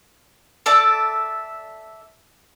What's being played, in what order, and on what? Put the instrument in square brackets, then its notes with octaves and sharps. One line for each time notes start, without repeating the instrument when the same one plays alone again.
[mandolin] A4 D5 E5 A5